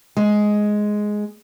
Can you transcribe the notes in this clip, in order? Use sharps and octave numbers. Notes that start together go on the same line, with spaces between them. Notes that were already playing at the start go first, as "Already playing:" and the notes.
G#3